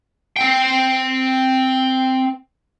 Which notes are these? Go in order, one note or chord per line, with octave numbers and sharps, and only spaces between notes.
C4 G5